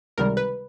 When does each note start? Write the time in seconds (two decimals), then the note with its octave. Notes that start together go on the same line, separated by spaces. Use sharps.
0.18 C#2 C3 D#3 G3 A#4
0.37 B4